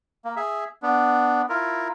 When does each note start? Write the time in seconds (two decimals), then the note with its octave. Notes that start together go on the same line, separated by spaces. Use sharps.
0.25 A#3
0.36 G#4 E5
0.82 B3 D4
1.49 E4 F4 A#4